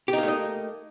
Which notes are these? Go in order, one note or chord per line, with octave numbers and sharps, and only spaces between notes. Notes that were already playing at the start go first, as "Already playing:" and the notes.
A3 A#3 D#4 G4 D#5